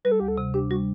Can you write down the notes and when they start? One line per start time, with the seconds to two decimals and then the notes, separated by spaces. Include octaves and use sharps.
0.05 G3 B4
0.12 A4
0.20 D2 G4
0.28 A4
0.38 C3
0.54 D4 G4
0.70 G3 F#4